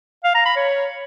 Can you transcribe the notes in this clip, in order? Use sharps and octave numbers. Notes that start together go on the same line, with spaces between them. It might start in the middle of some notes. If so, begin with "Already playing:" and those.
F5
A#5
B5
C#5